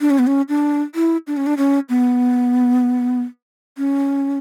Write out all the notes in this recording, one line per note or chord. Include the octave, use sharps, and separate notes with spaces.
D4
C#4
B3
C#4
D4
E4
D4
C#4
D4
C#4
B3
C#4